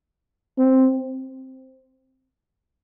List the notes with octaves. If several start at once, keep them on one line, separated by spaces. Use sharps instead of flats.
C4